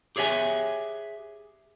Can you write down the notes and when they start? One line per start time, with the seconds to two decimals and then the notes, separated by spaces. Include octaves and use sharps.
0.16 G4 G#4 C#5 E5 G#5